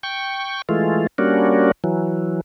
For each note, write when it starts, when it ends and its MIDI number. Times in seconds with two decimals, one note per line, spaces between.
0.03 0.62 79
0.03 0.62 85
0.69 1.07 52
0.69 1.07 56
0.69 1.07 57
0.69 1.07 65
1.18 1.72 55
1.18 1.72 58
1.18 1.72 61
1.18 1.72 62
1.18 1.72 66
1.84 2.41 52
1.84 2.41 54